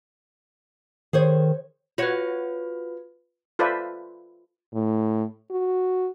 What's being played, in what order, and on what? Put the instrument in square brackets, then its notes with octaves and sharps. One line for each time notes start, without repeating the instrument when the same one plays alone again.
[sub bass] D#3 [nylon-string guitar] G#4 C5 C#5
[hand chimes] F4 B4 [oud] F#4 C#5
[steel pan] F4 A4 B4 C5 D5 E5
[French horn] A2
F#4